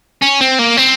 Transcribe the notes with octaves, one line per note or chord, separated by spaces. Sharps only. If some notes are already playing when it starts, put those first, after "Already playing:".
C#4
C4
A#3
C4